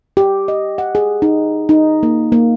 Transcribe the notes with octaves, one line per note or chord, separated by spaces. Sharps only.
G4
D#5
F#5
G#4
D#4
D#4
A#3
A#3